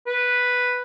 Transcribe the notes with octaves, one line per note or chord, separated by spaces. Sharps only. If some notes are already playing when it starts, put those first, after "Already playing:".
B4